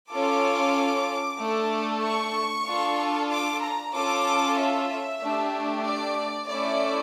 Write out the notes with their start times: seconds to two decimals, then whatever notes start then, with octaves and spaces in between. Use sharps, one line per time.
0.11 C#4 F4 A4 D6
1.40 A3 D4 A4
2.03 C#6
2.67 D4 F4 A4
3.30 D6
3.63 A#5
3.94 C#4 F4 A4 D6
4.58 E5
5.21 A3 D4 G4
5.85 D5
6.49 A3 C#4 E4 D5